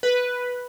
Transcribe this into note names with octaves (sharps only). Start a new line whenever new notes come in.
B4